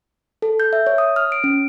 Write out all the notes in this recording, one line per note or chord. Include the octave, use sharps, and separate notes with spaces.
A4
G6
E5
C#5
D#6
F6
D7
C#4